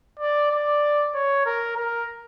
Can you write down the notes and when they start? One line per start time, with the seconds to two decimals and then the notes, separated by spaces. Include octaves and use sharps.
0.19 D5
0.51 D5
1.15 C#5
1.46 A#4
1.77 A#4